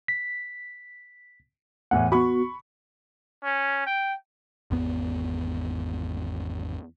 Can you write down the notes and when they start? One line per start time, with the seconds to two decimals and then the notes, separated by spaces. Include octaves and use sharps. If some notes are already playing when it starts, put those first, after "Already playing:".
0.08 B6
1.91 E2 A2 E3 F#5
2.12 B3 F#4 B5 C#6
3.44 C#4
3.86 G5
4.71 G#1 E2 B3